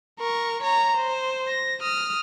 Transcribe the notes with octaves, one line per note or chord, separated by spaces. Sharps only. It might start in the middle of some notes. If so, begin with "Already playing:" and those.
A#4 C#6
C#5 A#5
C5
A#6
D#6 F6